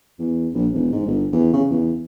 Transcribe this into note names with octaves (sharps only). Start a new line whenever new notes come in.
E2
A#1
E1
G#2
G1
E2
C#3
E2